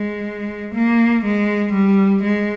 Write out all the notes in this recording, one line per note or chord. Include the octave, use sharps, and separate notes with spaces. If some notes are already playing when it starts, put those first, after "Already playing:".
Already playing: G#3
A#3
G#3
G3
G#3